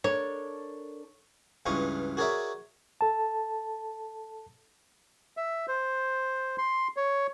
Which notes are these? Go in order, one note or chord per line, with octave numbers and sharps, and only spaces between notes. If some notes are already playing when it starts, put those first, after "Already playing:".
D4 A4 A#4 C#5
C#2 G2 E3 F4 D#5 C#6
F#4 G#4 A#4 C#5 D5 E5
A4 A5
E5
C5
C6
C#5